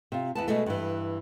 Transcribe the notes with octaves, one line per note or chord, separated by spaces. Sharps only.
C3 F4
E2 B3 A5
B2 G#3 A3
G2 E3